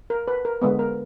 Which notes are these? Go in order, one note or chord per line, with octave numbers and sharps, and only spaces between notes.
A#4
B4
A#4
D3 G#3 B3 B4
A#4